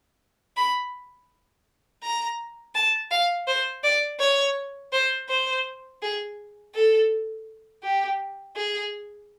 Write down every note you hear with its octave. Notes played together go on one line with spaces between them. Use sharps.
B5
A#5
A5
F5
C5
D5
C#5
C5
C5
G#4
A4
G4
G#4